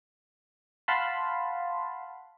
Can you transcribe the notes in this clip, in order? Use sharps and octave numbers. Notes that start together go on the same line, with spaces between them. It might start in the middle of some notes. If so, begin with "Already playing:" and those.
F5 F#5 A5 B5 C6